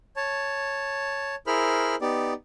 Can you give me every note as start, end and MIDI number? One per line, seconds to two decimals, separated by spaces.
0.16 1.35 73
0.16 1.35 81
1.47 1.95 64
1.47 1.95 68
1.47 1.95 70
1.47 1.95 72
1.47 1.95 83
1.47 1.95 89
2.01 2.33 59
2.01 2.33 63
2.01 2.33 67
2.01 2.33 74